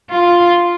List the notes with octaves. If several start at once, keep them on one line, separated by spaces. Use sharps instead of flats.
F4